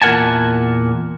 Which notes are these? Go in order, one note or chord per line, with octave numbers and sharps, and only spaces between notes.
E2 A#2 A#4 F#5 G#5 A5